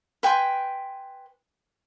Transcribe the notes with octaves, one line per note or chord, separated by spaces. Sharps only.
B4 G5 G#5 C6